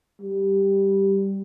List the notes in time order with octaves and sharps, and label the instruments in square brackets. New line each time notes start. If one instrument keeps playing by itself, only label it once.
[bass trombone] G3